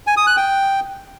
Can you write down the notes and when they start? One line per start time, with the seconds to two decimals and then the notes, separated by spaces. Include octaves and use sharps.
0.07 G#5
0.17 D#6
0.27 F#6
0.37 G5